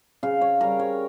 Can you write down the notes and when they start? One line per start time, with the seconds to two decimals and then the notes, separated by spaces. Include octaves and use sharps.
0.23 C#3 F5
0.41 C#5
0.60 G3 C#4 A#4
0.79 C#5